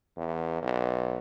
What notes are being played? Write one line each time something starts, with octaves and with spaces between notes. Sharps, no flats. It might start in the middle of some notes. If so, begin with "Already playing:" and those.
E2
B1